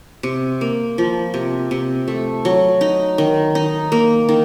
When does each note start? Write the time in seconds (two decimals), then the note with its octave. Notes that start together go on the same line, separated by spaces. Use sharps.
0.23 C3
0.61 A#3
0.98 F3
1.34 C3
1.71 C3
2.08 A3
2.45 F#3
2.81 D#4
3.18 D#3
3.55 D#4
3.92 A#3
4.29 D#3